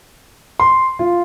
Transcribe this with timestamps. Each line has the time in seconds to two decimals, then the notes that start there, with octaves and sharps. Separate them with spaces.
0.60 C6
0.99 F4